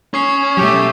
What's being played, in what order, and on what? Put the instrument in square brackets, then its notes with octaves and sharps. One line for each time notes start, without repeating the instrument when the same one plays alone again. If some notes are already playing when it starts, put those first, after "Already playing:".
[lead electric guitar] C#4 [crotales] C#6 D#6 C7
[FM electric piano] B2 F#3 [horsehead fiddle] A3 G4